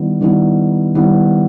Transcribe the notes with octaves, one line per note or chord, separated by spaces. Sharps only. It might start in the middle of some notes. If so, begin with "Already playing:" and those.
Already playing: D#3 G3 B3 E4
D#3 G3 B3 E4
D#3 G3 B3 E4